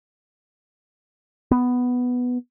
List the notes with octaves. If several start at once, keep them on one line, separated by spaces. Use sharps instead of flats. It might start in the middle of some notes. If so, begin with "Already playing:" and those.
B3